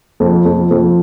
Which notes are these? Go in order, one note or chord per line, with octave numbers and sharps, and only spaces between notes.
F2
F2
F2